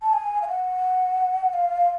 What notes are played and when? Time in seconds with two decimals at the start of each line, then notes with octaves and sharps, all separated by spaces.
0.03 A5
0.13 G#5
0.42 F5
0.48 F#5
1.53 F5